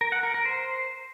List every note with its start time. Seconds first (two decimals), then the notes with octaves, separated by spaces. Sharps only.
0.01 A#4
0.12 F#5
0.23 A#4
0.34 A#4
0.45 C5